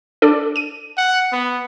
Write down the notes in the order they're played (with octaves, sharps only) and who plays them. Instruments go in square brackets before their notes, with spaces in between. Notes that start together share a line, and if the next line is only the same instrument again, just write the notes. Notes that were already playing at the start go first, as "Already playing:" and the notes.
[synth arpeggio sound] D4 A4 D5
D#7
[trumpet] F#5
B3